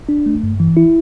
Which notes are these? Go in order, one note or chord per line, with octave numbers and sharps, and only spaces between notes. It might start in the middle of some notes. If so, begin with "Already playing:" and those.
D4
A3
G2
E3
E4